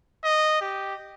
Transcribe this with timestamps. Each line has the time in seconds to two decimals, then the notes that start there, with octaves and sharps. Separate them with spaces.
0.25 D#5
0.61 G4